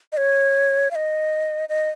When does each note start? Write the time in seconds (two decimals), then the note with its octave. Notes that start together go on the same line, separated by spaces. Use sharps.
0.12 D#5
0.17 C#5
0.91 F5
0.95 D#5
1.69 D#5